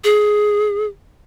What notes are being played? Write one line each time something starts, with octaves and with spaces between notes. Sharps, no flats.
G#4